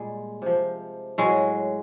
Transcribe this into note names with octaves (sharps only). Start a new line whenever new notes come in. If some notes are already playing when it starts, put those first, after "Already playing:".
Already playing: A#2 G3 G#3
C3 F3
A2 F#3 G#3